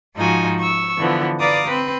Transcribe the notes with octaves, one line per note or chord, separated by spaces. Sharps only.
G#2 F3 D#4 F4 F#4 G#5
C#6 E6
D3 E3 F3 B3
B4 D5 F5 A#5 D6 D#6
C4 B4